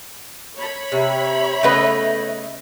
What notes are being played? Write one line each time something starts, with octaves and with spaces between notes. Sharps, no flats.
C#5 B5
C3 E5
C#3 A3 B3 D#4 B4